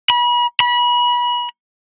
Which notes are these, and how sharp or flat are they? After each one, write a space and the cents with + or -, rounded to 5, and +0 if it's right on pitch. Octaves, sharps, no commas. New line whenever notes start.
B5 -35
B5 -30